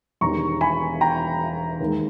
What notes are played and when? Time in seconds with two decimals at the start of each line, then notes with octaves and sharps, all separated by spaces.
0.21 E1 E2 D#3 G3 A#5 C#6
0.61 G#5 B5
1.01 G5 A#5
1.81 D#2 D#3 G#3